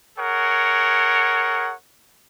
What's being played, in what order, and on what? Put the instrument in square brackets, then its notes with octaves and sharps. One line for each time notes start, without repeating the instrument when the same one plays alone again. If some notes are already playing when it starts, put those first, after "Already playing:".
[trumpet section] G#4 A#4 C#5 F#5